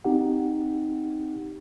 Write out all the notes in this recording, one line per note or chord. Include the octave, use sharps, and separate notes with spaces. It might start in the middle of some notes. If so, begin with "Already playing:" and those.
C4 D#4 G4 F#5